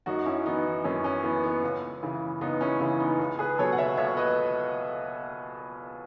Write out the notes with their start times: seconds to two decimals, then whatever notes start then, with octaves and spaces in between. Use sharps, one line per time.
0.06 F#2 D#4 F#4
0.26 C#4 E4
0.46 E3 B3 D#4
0.84 F#2 C#4
1.04 C#4
1.23 E3 B3
1.44 B3
1.63 C#2
2.03 C#3 E3
2.41 C#2 B3 D#4
2.61 C#4 E4
2.80 C#3 E3 C#4 E4
3.00 B3 D#4
3.19 C#2
3.39 G#4 B4
3.58 B2 F#3 A4 C#5
3.72 F#5
3.78 C#5 E5
3.97 C#2 C#5 E5
4.17 B4 D#5